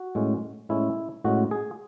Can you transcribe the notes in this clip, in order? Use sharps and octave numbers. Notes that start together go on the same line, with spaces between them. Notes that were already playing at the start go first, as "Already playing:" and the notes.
Already playing: F#4
A2 G#3 C#4
A2 G#3 C#4 E4
A2 G#3 C#4 F#4
G#4